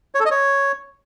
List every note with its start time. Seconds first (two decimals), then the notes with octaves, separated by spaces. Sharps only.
0.15 C#5
0.20 A4
0.25 D#5
0.31 C#5